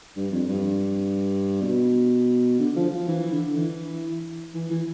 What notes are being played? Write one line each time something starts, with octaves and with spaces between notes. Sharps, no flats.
G2
F2
G2
B2
D3
F3
F3
E3
D3
E3
E3
E3